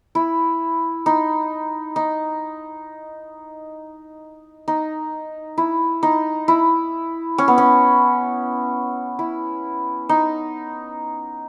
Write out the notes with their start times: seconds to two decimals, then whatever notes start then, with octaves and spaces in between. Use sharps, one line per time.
0.15 E4
1.06 D#4
1.96 D#4
4.68 D#4
5.58 E4
6.03 D#4
6.48 E4
7.38 C#4
7.48 B3
7.58 C#4
9.19 E4
10.09 D#4